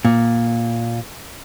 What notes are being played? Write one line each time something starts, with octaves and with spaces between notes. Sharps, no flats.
A#2